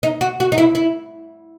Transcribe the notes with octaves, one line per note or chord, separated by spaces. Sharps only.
D#4
F#4
F#4
D#4
E4
E4